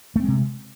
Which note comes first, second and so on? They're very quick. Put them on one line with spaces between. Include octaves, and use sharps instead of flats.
A3 C4 G#3 C3